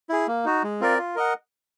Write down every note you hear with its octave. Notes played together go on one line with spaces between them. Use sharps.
E4 G#4
A#3
D#4 F#4
G#3
C4 F4 A#4 D5
F4
A#4 D#5 F#5